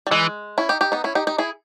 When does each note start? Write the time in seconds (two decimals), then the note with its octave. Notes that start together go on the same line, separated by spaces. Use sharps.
0.07 G3
0.11 E3 G#3
0.58 C#4 E4
0.69 D#4 G4
0.81 D#4 G4
0.92 B3 D#4
1.04 C#4 E4
1.15 D#4 G4
1.27 D#4 G4
1.38 E4 G#4